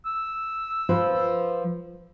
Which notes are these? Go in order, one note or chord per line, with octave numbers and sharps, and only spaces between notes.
E6
F3 F4 B4